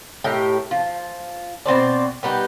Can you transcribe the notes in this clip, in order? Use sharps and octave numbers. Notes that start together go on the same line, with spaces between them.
A2 G4 A#4 D#5
F3
B2 C4 C5 D5
G3 B3 D#4 G4